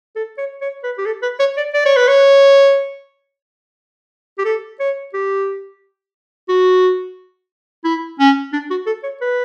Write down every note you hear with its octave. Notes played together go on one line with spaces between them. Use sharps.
A4
C#5
C#5
B4
G4
A4
B4
C#5
D5
D5
C#5
B4
C#5
G4
A4
C#5
G4
F#4
E4
C#4
D4
F#4
A4
C#5
B4